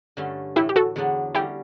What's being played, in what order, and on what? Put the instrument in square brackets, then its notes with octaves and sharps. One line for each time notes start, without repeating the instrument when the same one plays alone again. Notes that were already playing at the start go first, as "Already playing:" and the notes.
[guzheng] G2 D3 A3 C#4
[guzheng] A2 E3 A3 [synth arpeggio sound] E4 G4
[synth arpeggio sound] G4
F#4 A4
[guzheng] E2 D3 F#3 B3 D4
[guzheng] D3 G3 C#4 [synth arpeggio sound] E4 G4